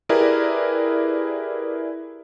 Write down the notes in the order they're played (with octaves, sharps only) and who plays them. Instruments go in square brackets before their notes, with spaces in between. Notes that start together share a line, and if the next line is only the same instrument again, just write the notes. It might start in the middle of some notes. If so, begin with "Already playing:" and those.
[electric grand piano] E4 G4 G#4 A#4 B4 D5